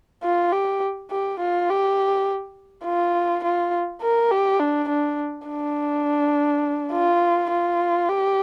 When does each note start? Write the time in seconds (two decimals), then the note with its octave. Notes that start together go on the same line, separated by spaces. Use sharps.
0.23 F4
0.52 G4
1.11 G4
1.40 F4
1.69 G4
2.85 F4
3.44 F4
4.02 A#4
4.31 G4
4.60 D4
4.89 D4
5.48 D4
6.93 F4
7.50 F4
8.09 G4